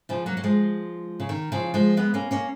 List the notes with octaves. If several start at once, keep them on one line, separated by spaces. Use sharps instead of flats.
C#3 F3
F#3 A#3
F#3
F3 G#3
C#3
D#3
C#3 F3
F3 G#3
G#3 B3
A#3 C#4
A#3 C#4